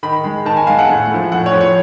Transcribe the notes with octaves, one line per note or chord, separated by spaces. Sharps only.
D#3 B5
G#3
D#3 A5
G#5
G#3 F5
F#5
A2
F3 A3
A2 F#5
C#5
F3 A3
C#5